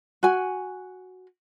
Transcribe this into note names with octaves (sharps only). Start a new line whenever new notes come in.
F#4 G#5